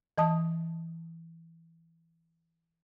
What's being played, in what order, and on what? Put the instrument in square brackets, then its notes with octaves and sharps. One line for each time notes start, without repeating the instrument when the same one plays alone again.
[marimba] E3 D#5 A5 D#6